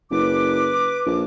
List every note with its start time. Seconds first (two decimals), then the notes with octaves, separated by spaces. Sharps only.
0.11 F#1 B4 D6
1.06 A#1